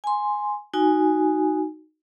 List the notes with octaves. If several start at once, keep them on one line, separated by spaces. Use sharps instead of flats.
G#5 C6
D#4 F#4 G#5